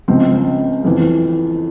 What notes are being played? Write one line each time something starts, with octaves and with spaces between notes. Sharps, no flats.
C#2 C#3 F3 C4
F2 E3